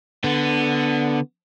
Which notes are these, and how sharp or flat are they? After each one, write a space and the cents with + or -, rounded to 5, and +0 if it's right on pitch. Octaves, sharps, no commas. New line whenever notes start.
D3 +0 B3 +5